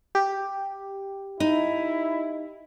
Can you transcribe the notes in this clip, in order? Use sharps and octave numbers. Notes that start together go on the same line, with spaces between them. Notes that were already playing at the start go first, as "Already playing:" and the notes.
G4
D#4 E4